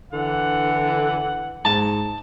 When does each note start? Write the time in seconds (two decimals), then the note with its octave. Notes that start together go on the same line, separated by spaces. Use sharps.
0.13 D3 E3 F#5
1.65 G#2 A5